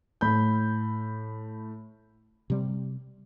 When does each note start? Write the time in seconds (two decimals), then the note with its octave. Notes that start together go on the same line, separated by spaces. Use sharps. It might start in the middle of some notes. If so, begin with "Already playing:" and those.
0.21 A2 B5 G6
2.50 C3 G3